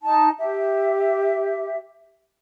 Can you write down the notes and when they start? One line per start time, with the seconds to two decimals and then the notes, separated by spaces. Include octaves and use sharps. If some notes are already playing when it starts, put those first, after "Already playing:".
0.02 D#4 A5
0.39 G4 E5